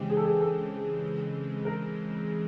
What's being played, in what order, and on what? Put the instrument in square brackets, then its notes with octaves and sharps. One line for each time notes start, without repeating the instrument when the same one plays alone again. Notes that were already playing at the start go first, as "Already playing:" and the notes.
Already playing: [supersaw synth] C#3 E3 G#3 C4 [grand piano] G4
[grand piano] G#4
A4
G#4
A4
A#4